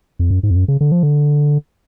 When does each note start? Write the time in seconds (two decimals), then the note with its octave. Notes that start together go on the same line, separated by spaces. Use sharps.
0.19 F2
0.31 F#2
0.43 G#2
0.51 F2
0.56 F#2
0.68 C#3
0.81 D3
0.92 F3
1.03 D3